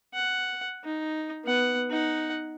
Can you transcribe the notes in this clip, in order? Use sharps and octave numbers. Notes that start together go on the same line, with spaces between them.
F#5
D#4
B3 F#5
D#4 F#5